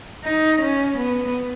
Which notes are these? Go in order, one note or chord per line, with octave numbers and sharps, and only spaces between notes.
D#4
C#4
B3